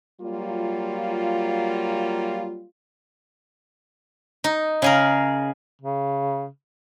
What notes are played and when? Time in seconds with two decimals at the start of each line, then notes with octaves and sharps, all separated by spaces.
0.21 F#3 G3 A#3 F4
4.44 D#4
4.82 C#3 G#4 A#4
5.81 C#3